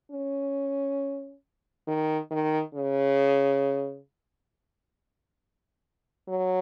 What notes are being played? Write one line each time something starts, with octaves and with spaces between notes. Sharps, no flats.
C#4
D#3
D#3
C#3
F#3